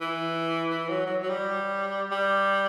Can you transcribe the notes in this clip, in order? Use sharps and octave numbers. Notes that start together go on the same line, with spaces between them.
E3
E3
F#3
F#3
F#3
G3
G3